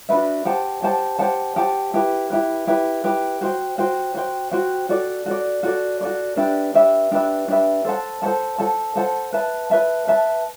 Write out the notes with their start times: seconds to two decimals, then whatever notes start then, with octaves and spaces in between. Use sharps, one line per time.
0.09 D4 F#4 B4 E5
0.45 G4 C5 F#5 A5
0.82 G4 C5 F#5 A5
1.19 G4 C5 F#5 A5
1.56 G4 C5 F#5 A5
1.94 E4 G4 B4
2.30 E4 G4 B4
2.67 E4 G4 B4
3.04 E4 G4 B4
3.41 F#4 C5 G5
3.78 F#4 C5 G5
4.15 F#4 C5 G5
4.51 F#4 C5 G5
4.89 F#4 A4 D5
5.26 F#4 A4 D5
5.63 F#4 A4 D5
6.01 F#4 A4 D5
6.36 D4 G4 B4 E5
6.74 D4 G4 B4 E5
7.11 D4 G4 B4 E5
7.48 D4 G4 B4 E5
7.85 A4 C5 F#5 A5
8.22 A4 C5 F#5 A5
8.58 A4 C5 F#5 A5
8.96 A4 C5 F#5 A5
9.33 B4 E5 A5
9.70 B4 E5 A5
10.07 B4 E5 A5